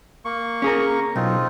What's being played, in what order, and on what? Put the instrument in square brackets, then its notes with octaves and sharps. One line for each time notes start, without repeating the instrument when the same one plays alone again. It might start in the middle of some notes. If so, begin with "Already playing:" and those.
[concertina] A#3 C#6
[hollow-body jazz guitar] C#4 G#4 A#4
[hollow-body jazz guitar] B1 [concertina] C4 D#4 F4